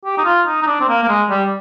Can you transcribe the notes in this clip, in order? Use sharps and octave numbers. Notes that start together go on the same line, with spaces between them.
G4
D#4
F4
D#4
D#4
D4
C4
A#3
A#3
G#3
G3